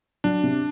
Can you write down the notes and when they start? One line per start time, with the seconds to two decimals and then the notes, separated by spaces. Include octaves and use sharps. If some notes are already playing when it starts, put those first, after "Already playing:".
0.24 F#3 D4
0.43 C3